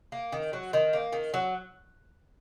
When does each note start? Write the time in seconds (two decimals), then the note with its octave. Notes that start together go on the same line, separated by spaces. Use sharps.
0.12 A#3
0.32 D#3
0.53 F#3
0.73 D#3
0.93 A#3
1.13 D#3
1.34 F#3